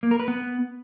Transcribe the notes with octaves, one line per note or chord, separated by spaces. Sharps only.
A#3
A#4
B4
B3